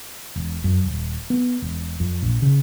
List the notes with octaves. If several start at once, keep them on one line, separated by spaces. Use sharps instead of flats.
E1
F#2
D#1
B3
E1
F2
A#1
C#3